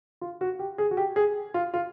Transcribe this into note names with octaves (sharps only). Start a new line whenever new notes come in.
F4
F#4
G4
G#4
F#4
G4
G#4
F4
F4